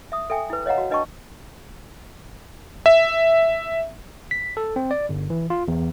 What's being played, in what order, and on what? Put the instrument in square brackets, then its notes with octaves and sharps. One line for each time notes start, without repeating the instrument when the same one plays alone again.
[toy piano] E5 D#6
A4 E5 G5 G#5
E4 B4
C#5 D#5 F5 F#5 A#5
F#4
D4 B4 D#5 G5 A5 C#6
[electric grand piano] E5
[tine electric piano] B6
A4
C4
D5
G1
E3
F4
E2